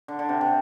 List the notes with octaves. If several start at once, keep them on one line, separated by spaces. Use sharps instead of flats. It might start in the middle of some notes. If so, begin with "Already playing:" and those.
D3
D3
C3
C3